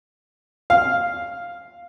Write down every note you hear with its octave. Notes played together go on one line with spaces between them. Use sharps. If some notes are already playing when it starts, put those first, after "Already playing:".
F5